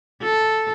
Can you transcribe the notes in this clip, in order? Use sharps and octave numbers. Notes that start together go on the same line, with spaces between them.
A4